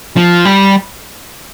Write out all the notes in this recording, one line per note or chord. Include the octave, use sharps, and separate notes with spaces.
F3
G3